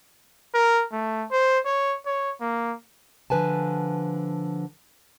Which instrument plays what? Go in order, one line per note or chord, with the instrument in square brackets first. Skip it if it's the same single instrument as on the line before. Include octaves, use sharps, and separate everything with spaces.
[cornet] A#4
A3
C5
C#5
C#5
A#3
[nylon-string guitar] D3 F3 B4 G#5 A5